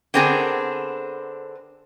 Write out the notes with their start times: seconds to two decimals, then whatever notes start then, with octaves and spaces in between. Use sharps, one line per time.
0.14 D3 B3 C4 D4 G#4 A#4